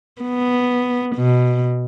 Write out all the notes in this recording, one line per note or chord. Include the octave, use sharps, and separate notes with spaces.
B3
B2